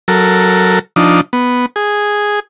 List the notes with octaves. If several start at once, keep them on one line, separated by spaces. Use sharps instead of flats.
F#3 A4 A#4
F3 D4 D#4
B3
G#4